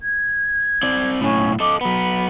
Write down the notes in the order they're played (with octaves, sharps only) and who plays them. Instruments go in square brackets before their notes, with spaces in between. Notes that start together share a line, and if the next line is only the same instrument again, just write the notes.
[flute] G#6
[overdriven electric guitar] C4 D5
[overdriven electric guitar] B1 A2 [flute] C#4
[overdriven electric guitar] A4 D#5 [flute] D6
[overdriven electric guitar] F#3 B3 [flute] B5